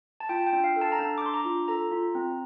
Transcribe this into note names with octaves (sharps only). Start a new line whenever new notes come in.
A5
F4 G5
G5
D4
F5
A4
A5
A#5
D4 A5
D6
D4 C6
A#5
F4
A4 A#5
F4
C4